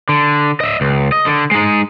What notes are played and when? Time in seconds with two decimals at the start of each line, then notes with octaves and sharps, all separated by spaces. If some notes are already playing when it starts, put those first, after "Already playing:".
0.09 D3
0.61 D#5 E5
0.81 C#2
1.12 D#5
1.26 D3
1.51 G#3 D#4